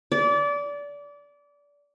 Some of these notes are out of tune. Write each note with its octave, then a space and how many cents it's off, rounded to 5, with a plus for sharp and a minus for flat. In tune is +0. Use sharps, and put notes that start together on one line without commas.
D5 -25